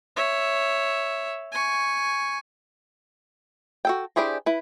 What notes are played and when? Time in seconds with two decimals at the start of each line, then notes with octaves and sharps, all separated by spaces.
0.16 C#5 E5
1.52 G#5 C#6
3.85 F#4 A4 G5
4.16 D4 E4 G4 G#4 C5
4.46 E4 B4